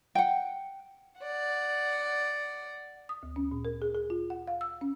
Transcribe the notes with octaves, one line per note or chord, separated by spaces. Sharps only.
F#5 G5
D5 F#5
D#6
D2
C#4
A#2
A#4
G#4
G#4
F4
F#5
F5
E6
C#4